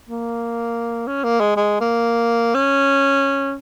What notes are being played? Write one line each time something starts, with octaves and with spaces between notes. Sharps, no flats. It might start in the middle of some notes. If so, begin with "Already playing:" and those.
A#3
C#4
A#3
G#3
G#3
A#3
C#4